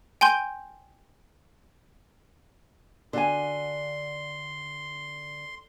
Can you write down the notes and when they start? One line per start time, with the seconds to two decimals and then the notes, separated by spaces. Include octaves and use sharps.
0.21 G5 G#5 C6 G6
3.13 D3 D4 F#4 G#5 C6